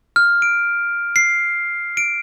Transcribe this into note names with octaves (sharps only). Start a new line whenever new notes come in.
F6
D7
C7
D7